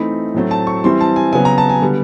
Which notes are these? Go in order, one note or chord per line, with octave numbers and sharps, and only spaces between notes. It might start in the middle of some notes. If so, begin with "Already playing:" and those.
Already playing: E3 A3 C4 D#4 B5
A2 F#3 A3 C4
A5
C#6
E3 G3 C4 E4 C6
A5
G#5
C#3 F#3 B3 G#5
A#5
A5
G#5
D3 G3 B3